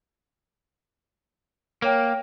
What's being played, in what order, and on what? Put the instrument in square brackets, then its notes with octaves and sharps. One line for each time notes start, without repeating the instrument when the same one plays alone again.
[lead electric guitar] A#3 [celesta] A#4 C#5 G5